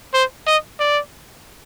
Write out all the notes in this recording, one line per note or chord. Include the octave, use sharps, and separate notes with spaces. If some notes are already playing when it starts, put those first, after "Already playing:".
C5
D#5
D5